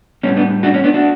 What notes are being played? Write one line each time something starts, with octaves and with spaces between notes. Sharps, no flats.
A2 G3 B3 C#4
B3 D4
D4 F#4
C#4
B3 D4
D4 F#4